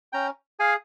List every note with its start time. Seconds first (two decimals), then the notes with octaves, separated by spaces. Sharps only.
0.13 C#4 G5 A#5
0.60 G#4 F5 G#5